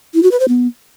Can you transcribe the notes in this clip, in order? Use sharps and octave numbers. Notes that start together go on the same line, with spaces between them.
E4
F#4
B4
C5
B3